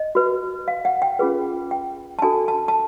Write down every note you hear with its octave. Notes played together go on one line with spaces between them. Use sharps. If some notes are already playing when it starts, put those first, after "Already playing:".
Already playing: D#5
F#4 B4
F5
F#5
G5
C#4 F4 G#4 B4
G5
A5
D4 F#4 A4 G#5
A5
A5